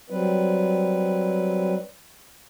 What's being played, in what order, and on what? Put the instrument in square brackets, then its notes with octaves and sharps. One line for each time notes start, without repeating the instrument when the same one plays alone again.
[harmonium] F#3 G3 C4 B4